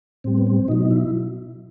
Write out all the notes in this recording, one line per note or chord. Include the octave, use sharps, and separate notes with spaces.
A2 G3 C4
B3
C4
B2 F#3 D#4
E4